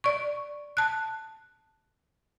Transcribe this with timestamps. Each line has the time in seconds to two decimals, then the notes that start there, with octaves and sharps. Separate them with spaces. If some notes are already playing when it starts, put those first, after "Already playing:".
0.04 D5 C#6
0.77 A5 F#6